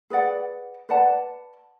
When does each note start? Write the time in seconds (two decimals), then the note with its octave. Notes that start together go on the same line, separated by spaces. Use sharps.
0.10 G#4 B4 D5 F#5
0.89 B4 D5 F#5 A5